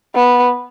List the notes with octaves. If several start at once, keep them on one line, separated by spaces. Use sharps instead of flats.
B3